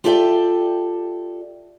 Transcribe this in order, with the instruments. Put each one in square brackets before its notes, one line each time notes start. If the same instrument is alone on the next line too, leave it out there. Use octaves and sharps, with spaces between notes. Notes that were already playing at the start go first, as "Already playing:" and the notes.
[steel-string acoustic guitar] F4 G4 A4 D5 E5 G5